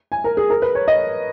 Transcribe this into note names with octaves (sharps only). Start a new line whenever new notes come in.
G#5
A#4
G#4
A#4
B4
C#5
D#5